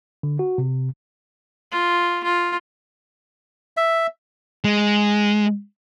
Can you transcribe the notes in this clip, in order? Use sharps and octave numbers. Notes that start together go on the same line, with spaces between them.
D3
F#4
C3
F4
F4
E5
G#3